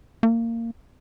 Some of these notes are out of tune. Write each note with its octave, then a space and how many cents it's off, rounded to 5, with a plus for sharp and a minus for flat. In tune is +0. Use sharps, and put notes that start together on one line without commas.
A#3 -20